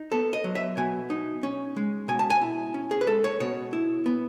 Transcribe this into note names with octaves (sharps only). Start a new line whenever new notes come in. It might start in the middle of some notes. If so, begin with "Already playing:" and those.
Already playing: D#4
B3 A4
D#5
F#3
E5
B2 G#5
D#4
C#4
G#3
B2 G#5
A5
G#5
E4
C#4
G#4
B4
G#3 A4
C#5
B2 C#5
E4
B3